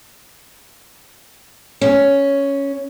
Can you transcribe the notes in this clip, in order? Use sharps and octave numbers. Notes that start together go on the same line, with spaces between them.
C#4